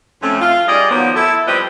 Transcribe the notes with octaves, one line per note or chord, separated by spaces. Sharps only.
F2 A3 C#4
F4
G3 G#4 D5 D#5
D#3 F3 F#3 A#3 B3
E4 A4
F3 G3 C4 G4 B4 D#5